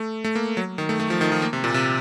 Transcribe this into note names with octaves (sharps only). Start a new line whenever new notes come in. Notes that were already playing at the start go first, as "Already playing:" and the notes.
Already playing: A3
A3
A#3
F#3
D#3
A3
A3
F3
D#3
F3
A#3
C3
A#2
C3